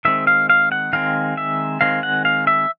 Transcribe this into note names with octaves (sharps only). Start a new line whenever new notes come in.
D#3 G#3 C4 E5
F5
F5
F#5
D#3 G#3 C4 F5
E5
D#3 G#3 C4 F5
F#5
F5
E5